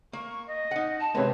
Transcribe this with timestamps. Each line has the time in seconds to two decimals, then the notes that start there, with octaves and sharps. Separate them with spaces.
0.13 A#3 C#6
0.47 D#5
0.71 D#4 F#5
1.00 A5
1.15 C3 G#3 B3 B4 C#5